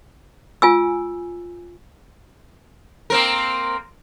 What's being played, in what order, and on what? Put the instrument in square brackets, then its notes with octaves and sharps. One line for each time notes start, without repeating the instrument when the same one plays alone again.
[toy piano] F4 G#5 E6
[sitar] A#3 C4 A#4